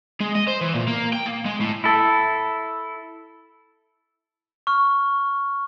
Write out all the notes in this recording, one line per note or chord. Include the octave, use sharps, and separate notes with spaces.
G#3
D#5
C5
E3
A#2
A#3
G5
A#3
G#3
A2
E4 A4
C#6 F6